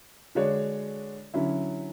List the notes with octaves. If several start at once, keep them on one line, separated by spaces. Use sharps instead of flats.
D3 G#3 D4 F#4 C#5
D3 F#3 C#4 E4